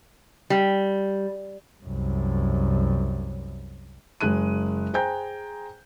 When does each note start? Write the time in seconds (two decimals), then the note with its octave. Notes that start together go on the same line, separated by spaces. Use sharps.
0.50 G3
1.83 C2 F#2
4.21 F#1 G#3 F#6 D#7
4.93 G#4 C5 G5 G#5 A#5 G6